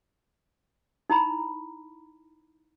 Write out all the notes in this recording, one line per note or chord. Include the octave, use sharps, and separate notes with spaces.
D#4 E4 A#5 B5